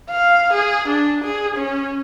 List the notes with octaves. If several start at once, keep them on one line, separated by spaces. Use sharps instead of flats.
F5
G#4
D4
G#4
C#4